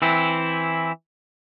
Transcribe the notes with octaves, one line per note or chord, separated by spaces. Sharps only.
E3 C4 E4